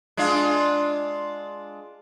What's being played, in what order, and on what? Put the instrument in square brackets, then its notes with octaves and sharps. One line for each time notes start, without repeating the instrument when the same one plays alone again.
[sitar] G#3 D4 F4